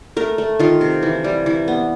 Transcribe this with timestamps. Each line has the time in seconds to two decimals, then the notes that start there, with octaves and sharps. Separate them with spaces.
0.17 A3 A#4
0.38 A3
0.59 D#3 F4
0.81 C3
1.03 E3
1.24 G3
1.46 E3
1.68 B3